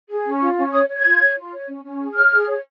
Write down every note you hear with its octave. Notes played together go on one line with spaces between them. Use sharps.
G#4
C#4
F4
C#4
C#5 D#6
C#5
G#6
F4
C#5
F4
C#5
C#4
C#4
G#4
C#5 F6
G#4
C#5